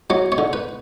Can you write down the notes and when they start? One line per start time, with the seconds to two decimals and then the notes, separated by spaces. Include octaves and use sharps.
0.10 F#3 C#5
0.32 C#5
0.38 D3
0.53 B4